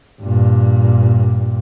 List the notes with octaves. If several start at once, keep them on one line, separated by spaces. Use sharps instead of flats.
G2 A#2